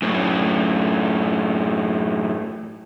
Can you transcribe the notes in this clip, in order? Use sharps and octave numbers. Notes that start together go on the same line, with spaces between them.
F#2 A2